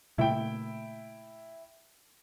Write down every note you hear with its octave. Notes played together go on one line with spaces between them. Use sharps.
A#2 C#3 A3 E4 G5